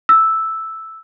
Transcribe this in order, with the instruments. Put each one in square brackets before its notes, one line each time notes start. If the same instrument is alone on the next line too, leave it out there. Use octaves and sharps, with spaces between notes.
[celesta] E6